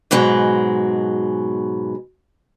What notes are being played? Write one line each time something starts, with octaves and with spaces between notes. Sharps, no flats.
G#2 B2 F#3 G#3